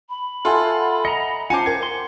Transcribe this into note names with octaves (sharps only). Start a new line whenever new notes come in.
B5
F4 A4 E5 F#5 G#5 C6
D#5 A#5 C#7
C#4 F4 C5 F#5 G#5 A5 D6
A#4 G5 G#6
C6